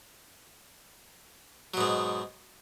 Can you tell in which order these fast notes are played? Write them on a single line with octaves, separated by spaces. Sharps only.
F#3 B2 G#2